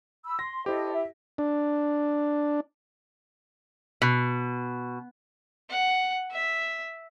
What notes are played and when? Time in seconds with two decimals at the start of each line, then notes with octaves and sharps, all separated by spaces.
0.25 B5 E6
0.39 C6 A#6
0.66 E4 G4 A4 C5 D#5
0.93 E5
1.38 D4
4.02 B2
5.70 F#5
6.32 E5